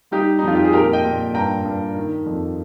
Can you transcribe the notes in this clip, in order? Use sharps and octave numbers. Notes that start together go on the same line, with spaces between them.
G3 D#4 G4
D#4
F2 F4
G4
G#4
A#2 G4 A#4
D#5 G5
A#2
G2 G5 A#5
G2
D#3
F2